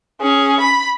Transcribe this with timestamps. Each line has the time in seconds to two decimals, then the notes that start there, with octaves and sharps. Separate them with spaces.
0.21 C#4 G#4
0.60 B5